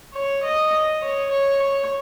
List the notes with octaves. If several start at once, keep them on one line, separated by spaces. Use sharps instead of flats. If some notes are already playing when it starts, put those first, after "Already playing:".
C#5
D#5
C#5
C#5
C#5